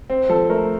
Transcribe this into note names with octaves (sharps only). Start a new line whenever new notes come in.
C4
F3 A4
A3 A#4